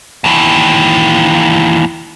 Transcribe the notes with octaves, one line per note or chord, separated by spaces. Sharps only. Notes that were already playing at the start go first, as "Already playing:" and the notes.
D#2 E3